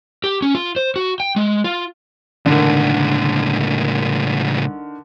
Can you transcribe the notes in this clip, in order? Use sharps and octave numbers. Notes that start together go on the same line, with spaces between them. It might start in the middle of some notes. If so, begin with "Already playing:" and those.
G4
C#4
F4
C5
F#4
G5
G#3
F4
C#2 A2 D3 D#3